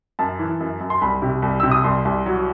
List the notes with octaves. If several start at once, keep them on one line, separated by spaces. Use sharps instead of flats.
F#2 A5
E3
F#2
F#2
C6
C2 B5
C3
C2
C3 E6
D#6
C2 C6
C2
F#3